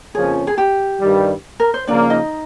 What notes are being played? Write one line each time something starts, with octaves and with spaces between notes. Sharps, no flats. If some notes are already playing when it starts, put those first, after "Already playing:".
F2 C#3 F3 A#3 C#4 G#4
G#4
G4
G2 D#3 G3
A#4
C5
C#3 F3 A#3 D4 D5
D#4 D#5